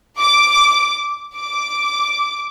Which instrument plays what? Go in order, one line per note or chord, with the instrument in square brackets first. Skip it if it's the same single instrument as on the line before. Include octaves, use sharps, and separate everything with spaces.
[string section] D6
D6